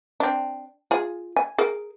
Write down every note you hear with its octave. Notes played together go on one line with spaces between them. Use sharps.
C4 D4
F4 G#4
G#5
G#4 A#4